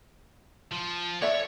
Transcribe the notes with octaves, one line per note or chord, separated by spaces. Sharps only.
F3
C#5 D5 E5